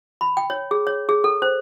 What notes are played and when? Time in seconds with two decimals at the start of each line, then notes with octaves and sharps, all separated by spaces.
0.21 B5
0.37 G5
0.50 C#5
0.71 G#4
0.87 C#5
1.09 G#4
1.24 A4
1.42 C5